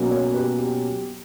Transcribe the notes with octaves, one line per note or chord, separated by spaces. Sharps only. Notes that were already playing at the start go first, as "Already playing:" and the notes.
Already playing: B2 F#3 A#3 C#4
A#4 C#5
G4 B4
G4